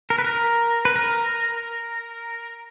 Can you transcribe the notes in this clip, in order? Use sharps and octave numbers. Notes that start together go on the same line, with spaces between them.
A#4
B4
A#4
B4
A#4